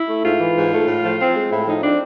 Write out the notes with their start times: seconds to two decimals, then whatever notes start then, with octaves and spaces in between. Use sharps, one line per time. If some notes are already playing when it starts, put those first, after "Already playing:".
Already playing: E4
0.09 A3
0.24 G#2 F4
0.39 E3
0.56 G#2
0.72 A3
0.87 A2
1.03 F3
1.19 C4
1.34 G#3
1.51 A2 E4
1.66 F3 D#4
1.82 C4 D4